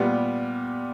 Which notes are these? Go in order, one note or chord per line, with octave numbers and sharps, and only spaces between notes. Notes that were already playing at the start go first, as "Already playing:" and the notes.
Already playing: A#2 G3 B3